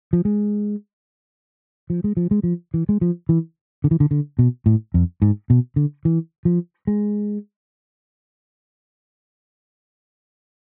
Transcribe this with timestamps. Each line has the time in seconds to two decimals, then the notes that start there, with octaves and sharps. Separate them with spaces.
0.13 F3
0.25 G#3
1.90 F3
2.04 G#3
2.17 F3
2.31 G#3
2.43 F3
2.74 E3
2.89 G#3
3.01 F3
3.29 E3
3.84 D3
3.91 E3
4.00 D3
4.11 D3
4.39 B2
4.66 A2
4.94 F2
5.22 G#2
5.50 B2
5.76 D3
6.05 E3
6.45 F3
6.87 G#3